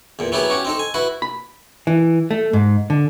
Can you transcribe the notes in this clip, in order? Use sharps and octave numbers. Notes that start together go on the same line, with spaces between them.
E2 A#2
F#3 B3 E4 G4 G#4
C#4 F#4 G4
C4 D#4 A4
G#5
E4 F#4 B4
B5
E3
A3
G#2
D3